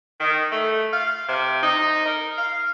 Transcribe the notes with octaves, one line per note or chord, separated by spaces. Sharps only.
D#3
A3
F5
C3
D#4
A#4
F5